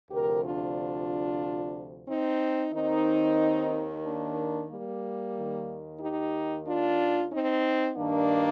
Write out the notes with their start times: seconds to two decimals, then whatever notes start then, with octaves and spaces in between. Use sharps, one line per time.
0.11 D2 C3 F3 G4 A#4
0.43 D4 F4
2.07 C4 D#4
2.72 D#2 D#3 C4 D#4
4.04 A#3 D4
4.69 G3 A#3
5.35 D#2 D#3
6.00 D#4 G4
6.66 D4 F4
7.31 C4 D#4
7.97 G2 D#3 A#3 D4